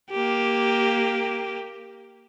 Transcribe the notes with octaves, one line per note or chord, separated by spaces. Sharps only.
A#3 G4